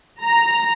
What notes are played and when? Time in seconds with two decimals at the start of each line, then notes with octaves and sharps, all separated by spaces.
0.24 A#5